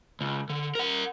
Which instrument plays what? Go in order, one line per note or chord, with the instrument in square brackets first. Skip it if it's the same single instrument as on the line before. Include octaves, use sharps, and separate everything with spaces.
[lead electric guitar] C#2
D3
A#4 F#5